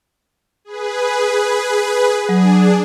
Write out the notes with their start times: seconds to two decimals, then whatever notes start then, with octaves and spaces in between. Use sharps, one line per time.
0.65 G#4 B4
2.29 F#3 D4 G#4